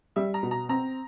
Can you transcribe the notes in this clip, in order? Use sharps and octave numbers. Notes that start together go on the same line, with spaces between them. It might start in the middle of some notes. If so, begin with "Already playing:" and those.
G3 E5
A#5
B2
A#5
C4 A#5